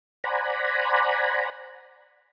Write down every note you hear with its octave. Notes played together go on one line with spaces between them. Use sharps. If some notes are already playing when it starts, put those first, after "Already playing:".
C5 D5 F#5 G#5 A#5 B5